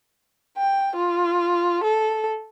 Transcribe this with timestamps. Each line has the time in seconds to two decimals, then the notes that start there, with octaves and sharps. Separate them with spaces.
0.58 G5
0.96 F4
1.84 A4